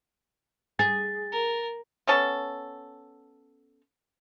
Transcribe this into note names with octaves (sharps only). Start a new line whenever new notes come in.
G#4 A6
A#4
B3 C#4 A4